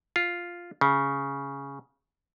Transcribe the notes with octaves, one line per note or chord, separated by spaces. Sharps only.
F4
C#3